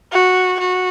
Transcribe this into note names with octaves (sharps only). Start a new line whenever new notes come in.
F#4
F#4